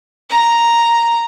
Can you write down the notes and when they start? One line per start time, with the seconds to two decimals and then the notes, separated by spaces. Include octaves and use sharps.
0.30 A#5